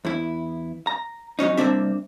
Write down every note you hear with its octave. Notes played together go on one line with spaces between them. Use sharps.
E2 E4
A#5
F2 F#3 C#4 D#4
C2 B2 A#3 C4 D4 E5